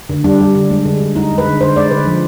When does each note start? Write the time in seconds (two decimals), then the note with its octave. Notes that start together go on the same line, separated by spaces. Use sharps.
0.09 D3
0.24 G3 D4
0.40 G3
0.55 D3
0.70 G#3
0.85 D3
1.00 D3
1.15 G#3 D#4
1.31 G#3
1.38 B4
1.46 D3
1.61 D3 C5
1.76 G#3 D5
1.91 D3 B4
2.06 F3